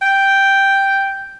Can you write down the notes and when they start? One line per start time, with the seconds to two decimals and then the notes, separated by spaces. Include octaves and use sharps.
0.02 G5